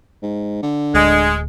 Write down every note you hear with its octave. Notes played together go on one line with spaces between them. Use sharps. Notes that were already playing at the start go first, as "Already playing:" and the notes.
G#2
D3
D1 G#1 D2 G#3